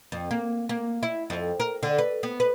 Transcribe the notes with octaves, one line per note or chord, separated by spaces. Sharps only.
F2
A#3
A#3
E4
F2
A#4
D3
B4
B3
B4